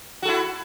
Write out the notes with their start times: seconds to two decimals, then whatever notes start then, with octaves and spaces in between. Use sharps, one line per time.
0.22 F#4
0.25 A4
0.28 E4